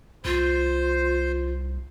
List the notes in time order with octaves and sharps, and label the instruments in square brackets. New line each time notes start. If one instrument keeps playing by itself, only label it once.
[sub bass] C2 [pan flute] F4 [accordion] C5